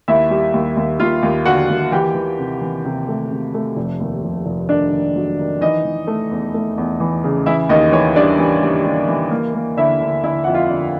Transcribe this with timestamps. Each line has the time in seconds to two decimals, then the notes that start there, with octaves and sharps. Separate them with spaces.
0.08 D#2 E4 E5
0.30 G3
0.53 D#2
0.77 D#2
1.00 D#2 F4 F5
1.23 D#2
1.45 D3 F#4 F#5
1.70 D#2
1.92 E3 G4 G5
2.15 E3
2.39 C3
2.61 E3
2.85 C3
3.08 A3
3.31 C3
3.54 A3
3.77 F1
4.00 D#2
4.24 F1
4.46 F1
4.69 D#3 D4 D5
4.93 D#3
5.16 F#3
5.39 D#3
5.61 E3 D#4 D#5
5.85 E3
6.07 A3
6.31 E2
6.54 A3
6.78 E2
7.00 E3
7.24 C#3
7.46 E3 E4 E5
7.69 D#2 D#4 D#5
7.92 E3 C#5
8.16 G3 D4 D5
8.38 E3
8.62 G3
8.85 G3
9.09 E3
9.31 A#3
9.54 A#3
9.77 D3 E4 E5
10.01 D3
10.24 D3 E4 E5
10.44 F2 F#5
10.54 F4 F5
10.69 D3